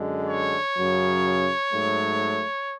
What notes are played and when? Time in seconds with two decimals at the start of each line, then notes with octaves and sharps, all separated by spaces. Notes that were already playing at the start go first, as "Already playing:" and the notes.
Already playing: F#2 D3 G#3
0.28 C#5
0.75 F#2 C#3 F#3
1.70 G#2 F#3 A3